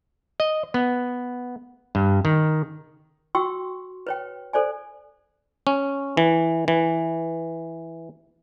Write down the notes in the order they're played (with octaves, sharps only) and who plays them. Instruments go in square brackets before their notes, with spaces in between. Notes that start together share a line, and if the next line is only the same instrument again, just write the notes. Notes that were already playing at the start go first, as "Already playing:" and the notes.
[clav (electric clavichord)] D#5
B3
G2
D#3
[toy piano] F#4 G5 C6 C#6 E6
B4 C#5 G5
A4 C5 D5 G#5
[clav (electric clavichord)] C#4
E3
E3